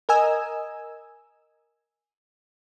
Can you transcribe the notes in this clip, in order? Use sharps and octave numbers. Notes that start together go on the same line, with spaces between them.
A#4 D#5 G#5 E6